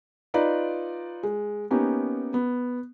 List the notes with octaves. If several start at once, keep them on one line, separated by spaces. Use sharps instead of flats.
D#4 F4 B4 D5 D#5
G#3
A#3 B3 C#4 D#4 G4
B3